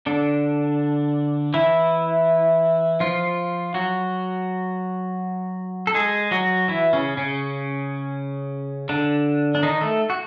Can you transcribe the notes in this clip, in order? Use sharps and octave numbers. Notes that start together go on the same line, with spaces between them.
D3 D4
E3 E4
F3 F4
F#3 F#4
A4
G#3 G#4
F#3 F#4
E3 E4
C#3 C#4
C#3 C#4
D3 D4
D4
D#3 D#4
A3 A4
F#4